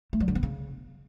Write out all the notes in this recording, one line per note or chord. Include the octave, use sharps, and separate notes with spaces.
A3
F#3
D3
B3
C#3